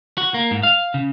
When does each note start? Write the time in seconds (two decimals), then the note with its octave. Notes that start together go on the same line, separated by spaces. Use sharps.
0.18 F#4
0.34 A#3
0.51 G#2
0.63 F5
0.94 C#3